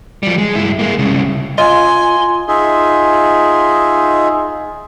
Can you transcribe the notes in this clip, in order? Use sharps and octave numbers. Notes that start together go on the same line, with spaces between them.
F3 G3
G#3
G2 E4
G#3 A#3
C2 C#3
F4 D#5 G#5 C6
D#4 F4 G#4 E5